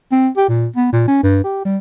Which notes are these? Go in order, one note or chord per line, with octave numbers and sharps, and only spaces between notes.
C4
G4
A#2
B3
A#2
C#4
G2
G4
G3